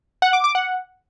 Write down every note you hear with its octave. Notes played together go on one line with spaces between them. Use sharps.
F#5
D6
D6
F#5